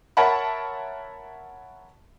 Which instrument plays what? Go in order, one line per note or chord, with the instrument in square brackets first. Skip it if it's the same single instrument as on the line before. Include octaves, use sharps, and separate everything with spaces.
[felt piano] A#4 C#5 E5 F#5 A5 B5